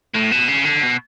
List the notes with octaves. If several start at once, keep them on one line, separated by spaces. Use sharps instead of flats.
A2
B2
C#3
D3
B2